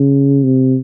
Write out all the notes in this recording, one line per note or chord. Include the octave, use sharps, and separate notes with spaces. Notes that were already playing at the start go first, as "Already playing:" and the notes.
Already playing: C#3
C3